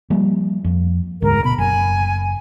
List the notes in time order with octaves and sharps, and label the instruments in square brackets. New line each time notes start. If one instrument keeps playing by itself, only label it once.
[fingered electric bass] F3 G3 A#3
F2
[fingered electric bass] E1 D2 G#2 [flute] A#4
[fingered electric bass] B2 [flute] B5
[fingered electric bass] F#1 [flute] G#5